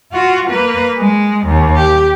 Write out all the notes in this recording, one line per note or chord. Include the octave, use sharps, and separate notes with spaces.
F4 F#4
A#3 B4
G#3
D#2
G4